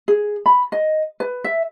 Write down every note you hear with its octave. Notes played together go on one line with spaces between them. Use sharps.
G#4
B5
D#5
B4
E5